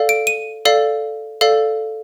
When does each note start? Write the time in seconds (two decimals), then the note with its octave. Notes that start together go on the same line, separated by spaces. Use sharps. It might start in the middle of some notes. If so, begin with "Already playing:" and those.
Already playing: A4 D5 F5
0.09 D7
0.27 D#7
0.65 A4 D5 F5
1.41 A4 D5 F5